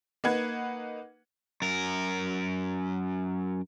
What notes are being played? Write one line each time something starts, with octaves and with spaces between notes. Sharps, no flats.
A#3 D#4 B4 F#5 G#6
F#2 A#4